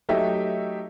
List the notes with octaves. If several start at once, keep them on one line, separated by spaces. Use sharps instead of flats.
F#3 A3 D#4 G4 E5